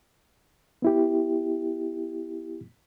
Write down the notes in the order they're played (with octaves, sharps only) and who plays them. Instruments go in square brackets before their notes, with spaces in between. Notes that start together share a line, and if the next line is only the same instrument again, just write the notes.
[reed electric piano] B3 E4 G4